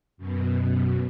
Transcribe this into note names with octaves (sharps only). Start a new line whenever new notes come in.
F#2 B2